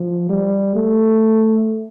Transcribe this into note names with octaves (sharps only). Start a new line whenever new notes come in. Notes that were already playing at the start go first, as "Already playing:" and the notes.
Already playing: F3
G3
A3